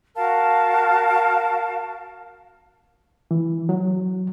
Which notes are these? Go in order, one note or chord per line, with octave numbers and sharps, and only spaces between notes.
F#4 A#4 F5 A5
E3
F#3